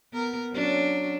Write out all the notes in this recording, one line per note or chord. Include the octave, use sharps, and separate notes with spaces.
B3 A#4
F#3 C#4 D4